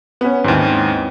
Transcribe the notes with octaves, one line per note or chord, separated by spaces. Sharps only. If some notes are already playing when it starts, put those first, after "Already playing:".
B3 C#4
D#2 G#2 G#3 C4 E4